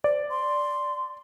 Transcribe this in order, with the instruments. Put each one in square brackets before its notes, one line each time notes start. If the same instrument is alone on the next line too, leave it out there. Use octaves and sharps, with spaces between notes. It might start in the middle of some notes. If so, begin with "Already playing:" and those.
[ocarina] C5 [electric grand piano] D5
[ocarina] C6